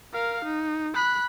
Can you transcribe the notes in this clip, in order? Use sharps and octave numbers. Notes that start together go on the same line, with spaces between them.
A#4 F5
D#4
B5 F#6